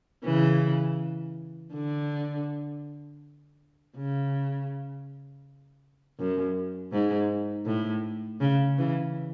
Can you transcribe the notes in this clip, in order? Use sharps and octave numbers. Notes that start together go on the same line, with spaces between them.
C#3 E3
D3
C#3
F#2
G#2
A2
C#3
C#3 E3